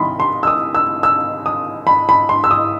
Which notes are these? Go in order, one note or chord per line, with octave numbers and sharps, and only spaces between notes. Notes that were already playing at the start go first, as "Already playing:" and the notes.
Already playing: C2 D#3 B5 C6 D#6
C6
E6
D#6
E6
E6
D#6
B5
B5
C6
E6
D#6